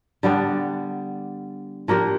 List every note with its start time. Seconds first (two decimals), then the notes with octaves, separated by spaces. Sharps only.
0.23 D3 G3 B3 D4
1.88 F3 A#3 D4 G4